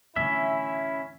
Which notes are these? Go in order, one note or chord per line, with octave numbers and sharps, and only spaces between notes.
E2 A2 D3 C#4 E4 E5